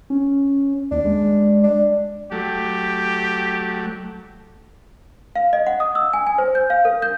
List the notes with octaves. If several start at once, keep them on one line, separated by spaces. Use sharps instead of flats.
C#4
D#2 D4
G#3
D4
F#3 A3 G4
F5
D#5
F#5
D#6
E6
G#5
G#5
C5
G6
F5
A#4
G6